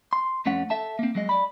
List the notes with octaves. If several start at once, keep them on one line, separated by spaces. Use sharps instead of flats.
C6
F2 A3 C#4 F#5
A4 E5 A5
A#3 C4
F#3 G#3 D#5
D5 B5